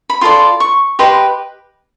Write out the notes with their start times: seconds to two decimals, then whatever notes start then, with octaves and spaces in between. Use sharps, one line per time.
0.10 B5
0.21 F4 A4 D5 C6
0.60 C#6
0.99 G4 B4 D#5 C6